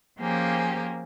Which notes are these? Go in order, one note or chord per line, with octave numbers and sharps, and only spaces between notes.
F3 A#3 C#4 G4 G#4